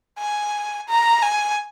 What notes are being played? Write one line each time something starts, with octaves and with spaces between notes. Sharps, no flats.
G#5
A#5
G#5